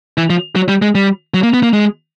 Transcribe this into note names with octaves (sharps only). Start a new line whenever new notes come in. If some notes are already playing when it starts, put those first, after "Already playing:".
E3
F3
F#3
G3
G#3
G3
F#3
A#3
B3
A#3
G#3